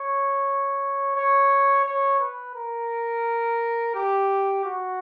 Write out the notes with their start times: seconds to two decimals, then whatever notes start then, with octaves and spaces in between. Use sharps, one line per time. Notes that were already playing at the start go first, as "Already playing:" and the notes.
Already playing: C#5
1.16 C#5
1.85 C#5
2.20 B4
2.55 A#4
3.95 G4
4.65 F#4